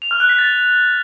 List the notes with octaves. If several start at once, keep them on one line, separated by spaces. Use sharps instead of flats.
F7
F6
F#6
B6
A6